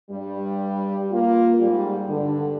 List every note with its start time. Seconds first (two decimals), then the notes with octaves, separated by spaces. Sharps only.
0.11 G2 G3
1.12 A#3 F4
1.60 G#2 G3
2.09 G2 D3